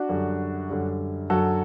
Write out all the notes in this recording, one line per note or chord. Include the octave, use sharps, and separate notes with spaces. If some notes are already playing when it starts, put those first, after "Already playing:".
Already playing: D4 F#4
F#2 D3 G3
F#2 D3 G3
F#2 D3 F#3 F#4 A4